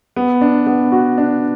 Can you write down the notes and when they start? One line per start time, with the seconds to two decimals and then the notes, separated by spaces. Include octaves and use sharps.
0.16 B3
0.41 D4
0.67 B3
0.92 F#4
1.18 D4